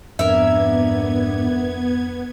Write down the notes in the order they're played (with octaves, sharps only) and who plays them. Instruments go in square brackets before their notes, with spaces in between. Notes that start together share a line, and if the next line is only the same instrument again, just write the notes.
[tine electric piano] F2 [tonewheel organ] G#2 D4 [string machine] B3 G#6 [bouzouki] A#4 E5